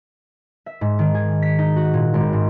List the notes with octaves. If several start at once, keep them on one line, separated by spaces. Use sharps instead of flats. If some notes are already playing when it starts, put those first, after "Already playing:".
E5
G#2
D#3
G#4
B6
D#4
F#4
A#2
G#1
G#2